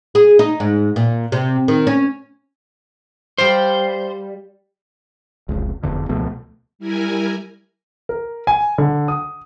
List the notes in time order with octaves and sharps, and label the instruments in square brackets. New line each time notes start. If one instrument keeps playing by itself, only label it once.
[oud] G#4
D#4
G#2
A#2
C3
D#3
C#4
[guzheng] G3 D5 F5 [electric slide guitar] C5
[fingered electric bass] F1 C#2
F1 E2 D3
C#2 B2 F3 A3
[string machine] G3 E4 A#4 G#5
[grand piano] A#4
G#5
D3
D#6